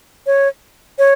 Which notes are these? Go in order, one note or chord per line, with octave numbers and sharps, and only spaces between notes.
C#5
C#5